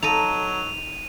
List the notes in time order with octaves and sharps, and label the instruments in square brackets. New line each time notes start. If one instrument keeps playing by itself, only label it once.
[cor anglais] F#3 [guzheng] D#4 A4 D#5 [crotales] D#7 F7